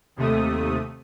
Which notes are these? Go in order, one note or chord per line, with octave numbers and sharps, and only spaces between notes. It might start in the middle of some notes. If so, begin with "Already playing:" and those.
D#2 C3 A3 D#6